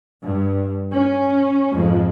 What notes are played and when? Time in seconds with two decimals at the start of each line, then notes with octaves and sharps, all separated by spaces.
0.22 G2
0.93 C#4
1.72 F2 G#2 F3